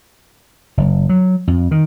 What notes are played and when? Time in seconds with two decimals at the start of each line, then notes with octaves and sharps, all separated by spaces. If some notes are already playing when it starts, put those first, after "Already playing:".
0.77 F#1
1.09 F#3
1.48 F2
1.71 D#3